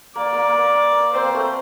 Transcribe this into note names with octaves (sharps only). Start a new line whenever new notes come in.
A#3 D5
A#3
A#3
C4 C5
A#3
A3